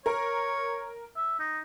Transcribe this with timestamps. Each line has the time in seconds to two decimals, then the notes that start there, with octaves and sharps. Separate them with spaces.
0.06 A#4 C#5
1.16 E5
1.40 D#4